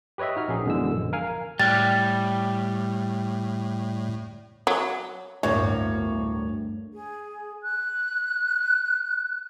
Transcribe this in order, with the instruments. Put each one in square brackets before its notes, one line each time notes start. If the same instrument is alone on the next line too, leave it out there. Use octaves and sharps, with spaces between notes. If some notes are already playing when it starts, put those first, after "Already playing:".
[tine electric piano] G4 B4 C#5 D#5 E5
D#4 F#4 F6
A#1 C#4 G#4
F#2 B2 D3 E3 G#3 E6
A#1
A#4 F5 G#5 F6
[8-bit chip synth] A2 [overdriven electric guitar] G3 [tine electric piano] G5 F6 F#6 [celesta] A6
[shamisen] F#3
[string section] G1 [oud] D2 [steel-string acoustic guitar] A2 A#3 [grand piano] C#5
[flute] G#4
F#6